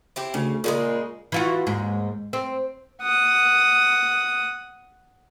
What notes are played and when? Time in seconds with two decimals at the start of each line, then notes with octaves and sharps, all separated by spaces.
0.16 C4 E4 G4
0.34 D2 C#3
0.64 A#2 C#3 E3 G#3
1.32 E3 F4 F#4
1.67 D#2 G#2
2.33 C4
3.02 F#5 D#6